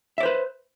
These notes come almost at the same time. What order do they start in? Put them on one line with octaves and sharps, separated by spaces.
E5 D5 C5 B4